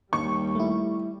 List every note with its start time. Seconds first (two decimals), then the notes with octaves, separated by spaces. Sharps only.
0.13 D#2 G3 C#6
0.55 A3 E4